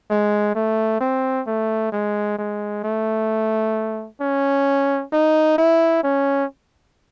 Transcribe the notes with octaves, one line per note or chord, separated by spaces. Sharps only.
G#3
A3
C4
A3
G#3
G#3
A3
C#4
D#4
E4
C#4